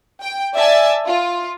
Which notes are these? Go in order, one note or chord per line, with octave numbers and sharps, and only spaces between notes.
G5
D5 E5 G#5 A5
F4